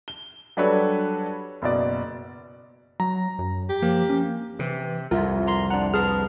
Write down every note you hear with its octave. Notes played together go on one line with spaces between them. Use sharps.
G7
F#3 G3 D4 A4 B4 C#5
F#1 B2 D5
F#3 A#5
F#2
G4
F3 A#3
C#4
C3 E3
C2 F2 F4 A#4 E5
A#5 C6
D4 F#5 A#5
G#4 B4 A5 F6